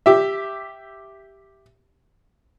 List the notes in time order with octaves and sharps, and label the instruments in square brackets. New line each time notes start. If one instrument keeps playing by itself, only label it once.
[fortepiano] G4 E5